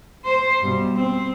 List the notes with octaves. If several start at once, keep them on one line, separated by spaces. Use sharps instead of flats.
C5
G2 B2
C4